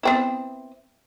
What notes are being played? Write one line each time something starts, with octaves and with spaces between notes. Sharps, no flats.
B3 C4 E4